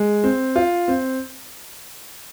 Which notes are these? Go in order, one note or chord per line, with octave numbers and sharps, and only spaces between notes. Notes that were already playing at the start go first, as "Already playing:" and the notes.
Already playing: G#3
C4
F4
C4